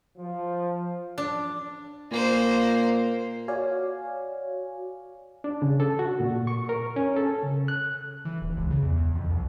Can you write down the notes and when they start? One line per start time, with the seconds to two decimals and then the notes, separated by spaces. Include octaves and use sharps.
0.18 F3
1.18 D4
2.11 A#2 A#3 C5
3.48 F#4 C#5 D5 F5 G#5
5.44 D4
5.62 C#3
5.80 A4
5.99 F#4
6.20 A#2
6.47 C#6
6.69 A#4
6.96 C#4
7.16 A4
7.42 C#3
7.68 F#6
8.25 E3
8.42 D#1
8.57 C#2
8.71 C#3
8.83 E2
8.96 E2
9.15 F2
9.29 C2